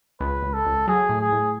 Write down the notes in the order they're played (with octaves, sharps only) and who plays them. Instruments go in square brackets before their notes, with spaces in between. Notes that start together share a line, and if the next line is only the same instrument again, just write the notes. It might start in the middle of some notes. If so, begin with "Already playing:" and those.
[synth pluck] C#2 [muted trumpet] B4
[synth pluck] C#2
[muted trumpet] A4
[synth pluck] C#2
[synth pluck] F#3 [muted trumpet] G#4
[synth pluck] A2
[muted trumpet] G#4
[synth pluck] A2